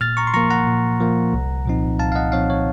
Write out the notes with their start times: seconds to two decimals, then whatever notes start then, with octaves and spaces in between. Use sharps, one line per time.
0.01 A#2 F6 A6
0.17 A#5 C#6
0.27 C6
0.34 F3 A#3 A#5 C#6
0.50 F#5 A#5
0.67 A#2
1.01 F3 A#3
1.33 C2
1.66 A#2 F3 C4 D#4
1.99 C2 F5 A5
2.12 F5
2.15 D#5 F#5
2.32 A#2 F3 C4 D#4 C#5 F5
2.50 C#5